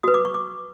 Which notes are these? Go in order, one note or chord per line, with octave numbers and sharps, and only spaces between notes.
F#4 B4 D#6
D6
C#6
D6